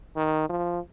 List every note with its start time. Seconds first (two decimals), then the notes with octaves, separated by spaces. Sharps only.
0.16 D#3
0.49 F3